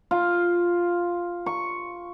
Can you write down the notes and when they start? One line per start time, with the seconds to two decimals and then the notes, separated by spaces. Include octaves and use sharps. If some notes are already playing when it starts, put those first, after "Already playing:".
0.11 F4
1.46 C#6